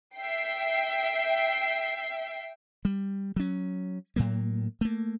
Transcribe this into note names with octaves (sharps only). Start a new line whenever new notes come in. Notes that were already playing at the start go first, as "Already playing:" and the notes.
E5 G5 C7
G3
F#3 C#4
A2 F#3 A#3
A3 A#3